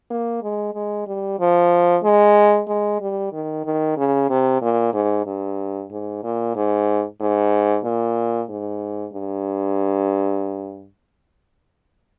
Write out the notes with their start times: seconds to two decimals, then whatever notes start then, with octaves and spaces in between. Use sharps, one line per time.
0.10 A#3
0.42 G#3
0.74 G#3
1.07 G3
1.39 F3
2.04 G#3
2.68 G#3
3.01 G3
3.32 D#3
3.65 D#3
3.97 C#3
4.30 C3
4.62 A#2
4.94 G#2
5.27 G2
5.91 G#2
6.24 A#2
6.56 G#2
7.20 G#2
7.84 A#2
8.49 G#2
9.13 G2